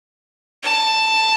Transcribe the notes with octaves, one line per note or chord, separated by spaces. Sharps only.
A5